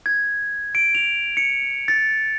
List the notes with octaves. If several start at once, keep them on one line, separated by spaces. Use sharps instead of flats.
G#6
D7
F7
C#7
A6